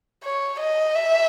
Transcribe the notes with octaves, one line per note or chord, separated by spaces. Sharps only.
C#5
D#5
E5